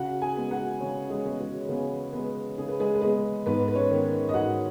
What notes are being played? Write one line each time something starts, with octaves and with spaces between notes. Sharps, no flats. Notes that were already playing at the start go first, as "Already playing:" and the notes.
Already playing: C#3 F#4 F#5
G#4 G#5
G#3 B3
F#4 F#5
C#3 C#4 C#5
G#3 G#4
G#3 B3
F#4
C#3 B3 B4
G#3 B3 B4
C#3 G#4
B4
G#3 G#4
B4
G#3 B3 G#4
G#2 B3 B4
B4
C#4 C#5
D#3 B3
D#5
G#2 F#4 F#5